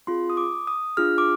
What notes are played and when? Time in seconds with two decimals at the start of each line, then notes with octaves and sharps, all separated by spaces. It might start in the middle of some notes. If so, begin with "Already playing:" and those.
0.07 C4 F4 G#4 C6
0.30 D#6
0.37 D6
0.67 D#6
0.97 D4 F4 G#4 F6
1.18 D6